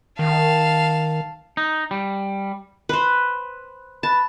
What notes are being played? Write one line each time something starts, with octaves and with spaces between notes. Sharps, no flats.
D#3 F5 A5
D#4
G3
B4 C5
B4 A5